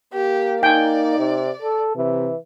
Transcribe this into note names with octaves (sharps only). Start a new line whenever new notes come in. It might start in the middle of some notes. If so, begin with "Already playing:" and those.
A#3 G4
D#4 D5 G5 G#5
C3
A4
C3 E3